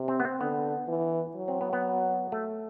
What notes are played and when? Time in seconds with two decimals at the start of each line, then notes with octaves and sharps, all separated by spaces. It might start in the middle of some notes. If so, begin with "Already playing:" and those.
Already playing: C3
0.08 C4
0.20 B3
0.25 C4
0.40 D3 B3
0.88 E3
1.36 F#3
1.48 C4
1.61 B3
1.73 B3
2.32 A3